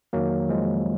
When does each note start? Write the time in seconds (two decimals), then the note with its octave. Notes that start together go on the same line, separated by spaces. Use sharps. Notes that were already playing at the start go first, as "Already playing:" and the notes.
0.13 F2 D#3 F#3 A#3
0.49 F3 G#3